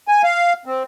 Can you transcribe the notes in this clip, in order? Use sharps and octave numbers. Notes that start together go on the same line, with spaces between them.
G#5
F5
C4